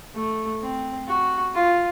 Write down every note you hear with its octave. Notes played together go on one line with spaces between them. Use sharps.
A3
C4
F#4
F4